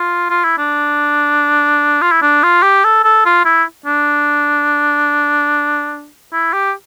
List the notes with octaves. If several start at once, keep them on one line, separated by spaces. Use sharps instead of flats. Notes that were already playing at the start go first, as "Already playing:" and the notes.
Already playing: F4
F4
E4
D4
F4
E4
D4
F4
G4
A4
A4
F4
E4
D4
E4
G4